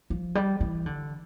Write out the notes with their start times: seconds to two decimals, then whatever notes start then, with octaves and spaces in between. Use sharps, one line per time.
0.10 F3
0.35 G3
0.61 E3
0.86 D3